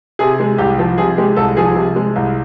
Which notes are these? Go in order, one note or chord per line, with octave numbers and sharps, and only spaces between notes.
C3 G#4
G#3
C2 G4
F3
C3 G#4
G#3 G4
C2 A4
F3 G#4
C3
G#3
C2